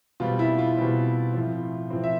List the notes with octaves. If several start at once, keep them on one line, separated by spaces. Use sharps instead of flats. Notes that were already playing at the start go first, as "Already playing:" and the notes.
B2 G3 C4 F4
E4
F4
B2 G3 C4
A2 F3 C4
A2 F3 C4
E5